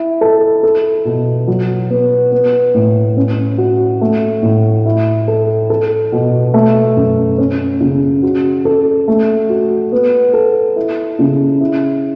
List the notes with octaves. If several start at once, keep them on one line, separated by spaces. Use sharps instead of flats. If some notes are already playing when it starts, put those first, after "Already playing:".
Already playing: E4
A4
A4
B2
F#3
B3
B3
A2
C#4
F#4
A3
A2
E4
A4
A4
B2
A3
F#2
C#4
C#3
F#4
A4
A3
F#4
B3
A4
E4
C#3
E4